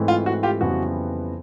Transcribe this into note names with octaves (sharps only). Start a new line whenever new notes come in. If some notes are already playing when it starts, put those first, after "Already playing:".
Already playing: G#2 E3 A3 C4
F4
F#4
F4 G4
F2 C#3 E3 G3 B3 F#4